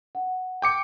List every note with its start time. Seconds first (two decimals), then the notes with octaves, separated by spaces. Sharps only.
0.15 F#5
0.62 G5 D6 C#7